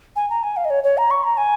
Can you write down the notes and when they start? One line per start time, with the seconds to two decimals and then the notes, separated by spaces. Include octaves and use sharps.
0.16 G#5
0.30 A#5
0.43 G#5
0.57 F5
0.65 D#5
0.70 C#5
0.84 C#5
0.98 A#5
1.11 C#6
1.24 A#5
1.37 G#5